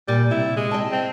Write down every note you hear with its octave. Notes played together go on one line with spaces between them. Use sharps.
A#2 G3
C3 E4
G#3
D#5 G5 A5
C4